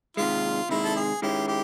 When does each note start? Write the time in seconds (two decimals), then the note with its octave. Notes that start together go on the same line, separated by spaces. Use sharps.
0.17 C3 D#3 G#3 F4
0.69 C3 D#3 G#3 E4
0.84 A4
0.96 G#4
1.22 D#3 G#3 C#4 E4 G4
1.48 G4